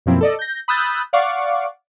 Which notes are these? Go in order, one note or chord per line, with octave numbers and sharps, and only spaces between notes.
F#2 B2 F3 A#3 C4 E4
A4 D5 D#5
G6 A#6
B5 D#6 E6 F#6 G6 A6
D5 F5 F#5 C#6 D6